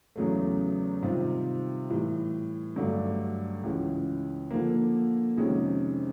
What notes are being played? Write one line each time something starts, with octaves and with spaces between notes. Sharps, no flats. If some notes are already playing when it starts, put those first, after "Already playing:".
E2 C#3 F#3 A3
C3 D#3 G3 C4 F4
A2 E3 G3
G2 D3 F#3 A3 D4
C#2 C#3 E3 G#3
D3 F3 A#3
F2 C3 D#3 G#3 C#4